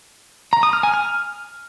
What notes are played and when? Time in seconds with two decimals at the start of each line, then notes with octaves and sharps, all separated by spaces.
0.53 A#5
0.63 D#6
0.73 F6
0.83 G#5
0.94 F6